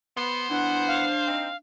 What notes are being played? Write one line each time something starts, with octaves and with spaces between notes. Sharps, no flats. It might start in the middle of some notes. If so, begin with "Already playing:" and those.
B3 C5
E3 B3 D4 F#5
F5
C4 D#4 C5